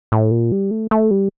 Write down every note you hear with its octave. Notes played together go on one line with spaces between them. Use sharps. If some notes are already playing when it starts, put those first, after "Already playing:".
A2
A#2
G3
A3
A3
G3